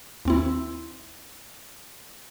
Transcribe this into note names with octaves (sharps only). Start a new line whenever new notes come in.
D#2 C4 E4